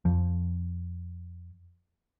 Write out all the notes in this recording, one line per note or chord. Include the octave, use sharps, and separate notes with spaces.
F2 F3